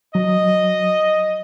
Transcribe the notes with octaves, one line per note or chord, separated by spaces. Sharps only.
F#3 D#5